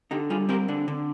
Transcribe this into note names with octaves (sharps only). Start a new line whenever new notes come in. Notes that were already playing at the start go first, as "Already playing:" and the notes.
D3 D#4 G4
G3 F4 G#4
C4 G4 A#4
D3 D4
D3